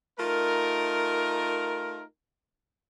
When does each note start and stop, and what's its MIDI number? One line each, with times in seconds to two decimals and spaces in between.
0.20 2.04 57
0.20 2.04 63
0.20 2.04 65
0.20 2.04 70